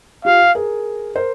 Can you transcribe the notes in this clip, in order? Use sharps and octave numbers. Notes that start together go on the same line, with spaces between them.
F4 G4 F5
G#4 A#4
A#4 C5